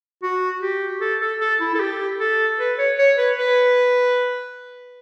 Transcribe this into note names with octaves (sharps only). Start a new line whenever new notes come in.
F#4
G4
A4
A4
A4
E4
A4
G4
A4
B4
C#5
C#5
B4
B4